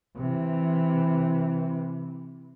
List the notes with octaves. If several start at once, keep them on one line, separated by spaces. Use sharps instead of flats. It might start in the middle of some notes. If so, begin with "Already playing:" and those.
C3 E3